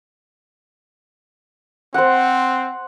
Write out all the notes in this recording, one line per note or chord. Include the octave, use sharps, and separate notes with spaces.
C4 C5 F#5